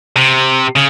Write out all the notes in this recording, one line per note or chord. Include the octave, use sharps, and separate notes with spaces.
C3
C#3